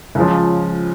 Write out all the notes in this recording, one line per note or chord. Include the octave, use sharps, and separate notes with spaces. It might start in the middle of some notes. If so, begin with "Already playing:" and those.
C#2 C#3 F3